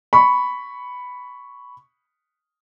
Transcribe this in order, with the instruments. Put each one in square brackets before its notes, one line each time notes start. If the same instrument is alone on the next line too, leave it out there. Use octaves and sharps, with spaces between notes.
[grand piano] B5 C#6